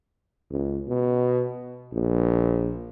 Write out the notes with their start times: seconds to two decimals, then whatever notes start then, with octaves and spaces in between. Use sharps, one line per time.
0.51 C#2
0.88 B2
1.93 A#1